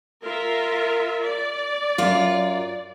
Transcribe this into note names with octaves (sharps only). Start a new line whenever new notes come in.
F4 A#4 E5
D5
F#2 F4